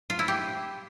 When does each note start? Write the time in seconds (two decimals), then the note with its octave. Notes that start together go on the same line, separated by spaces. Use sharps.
0.10 F4
0.19 E4
0.28 G4